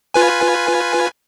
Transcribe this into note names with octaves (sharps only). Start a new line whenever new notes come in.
F4 B4 G#5